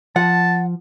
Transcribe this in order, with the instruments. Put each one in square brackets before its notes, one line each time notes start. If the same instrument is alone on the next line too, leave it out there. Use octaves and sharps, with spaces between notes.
[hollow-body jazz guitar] F3 [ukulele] F#5 [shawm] A5